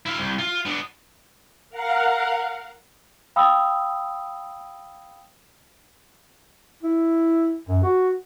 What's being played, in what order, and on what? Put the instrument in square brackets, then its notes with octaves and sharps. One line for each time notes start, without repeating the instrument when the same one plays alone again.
[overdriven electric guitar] E4 F5
C2
F4
B3 D4
[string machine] A#4 F5 F#5
[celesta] F5 G5 B5 D#6 E6
[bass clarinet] E4
F#2
F#4